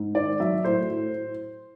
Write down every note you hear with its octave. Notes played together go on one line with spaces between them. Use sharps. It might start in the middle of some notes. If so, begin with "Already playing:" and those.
Already playing: G#2
D#3 D5
F#3 E5
A2 C5
A2